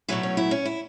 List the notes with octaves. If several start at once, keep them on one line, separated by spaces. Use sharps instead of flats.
B2 F#3 A3 E4
C#4
E4
C#4
E4